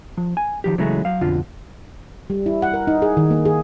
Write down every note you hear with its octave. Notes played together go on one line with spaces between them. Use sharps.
F3
G#5
D#3 F3 G4
C#3 E3 F#3 G#3 A3 C#4
F#3 F5
B1 F2 D3 F4
G3
E4
F#5
A#4
D#4
G#4
D#3
A#3
G#4